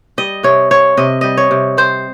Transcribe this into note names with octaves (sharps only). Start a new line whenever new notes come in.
G3 D#5
C3 C#5
C4 C#5
C3 D#5
G3 D#5
C#5
C3
C4 C5